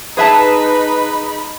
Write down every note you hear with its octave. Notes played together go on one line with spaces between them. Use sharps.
D#4 G#4 B4 E5 A5 B5